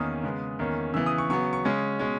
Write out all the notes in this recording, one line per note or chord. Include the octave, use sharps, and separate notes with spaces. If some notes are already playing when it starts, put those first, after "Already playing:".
Already playing: E2 D#3 A#3 C#4 D#6
C#3 G#3 B3
E2 D#3 A#3 C#4
C#3 E3 B3 E6
D#6
C#6
C#3 F#3 B3 C#6
C#6
C#3 G#3 C#4
B2 G#3 C#4